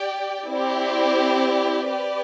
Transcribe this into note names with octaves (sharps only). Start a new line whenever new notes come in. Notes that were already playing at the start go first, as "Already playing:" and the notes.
Already playing: G4 D5 G5
C4 E4 G4 D5
G4 B4 D5